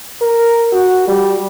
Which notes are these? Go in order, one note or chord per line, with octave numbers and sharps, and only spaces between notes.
A#4
F#4
G3